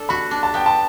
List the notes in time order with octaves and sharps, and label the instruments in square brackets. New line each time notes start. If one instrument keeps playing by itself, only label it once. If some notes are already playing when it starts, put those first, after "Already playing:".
Already playing: [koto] D4 A4
[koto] F#4 [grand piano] B5
[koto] D4
[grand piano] A5
[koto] B3 [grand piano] G5
[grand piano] A5